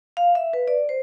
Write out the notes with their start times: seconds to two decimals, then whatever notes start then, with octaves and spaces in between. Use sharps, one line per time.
0.17 F5
0.35 E5
0.53 B4
0.68 D5
0.89 C5